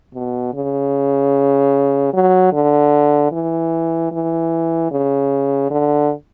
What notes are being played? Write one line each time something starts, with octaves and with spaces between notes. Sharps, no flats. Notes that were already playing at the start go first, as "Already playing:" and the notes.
B2
C#3
F#3
D3
E3
E3
C#3
D3